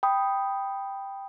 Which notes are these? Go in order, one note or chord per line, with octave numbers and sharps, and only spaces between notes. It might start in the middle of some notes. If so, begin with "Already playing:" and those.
G5 B5 D#6